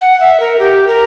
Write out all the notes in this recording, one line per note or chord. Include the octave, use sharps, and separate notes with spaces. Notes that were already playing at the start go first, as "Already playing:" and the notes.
F#5
E5
A#4
G4
A#4